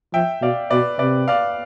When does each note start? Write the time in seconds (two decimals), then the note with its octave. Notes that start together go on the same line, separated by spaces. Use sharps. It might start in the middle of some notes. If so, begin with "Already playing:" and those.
0.13 F3 E5 G5
0.42 B2 D5 F5
0.70 B2 B4 D5
0.99 C3 B4 D5
1.28 D5 F5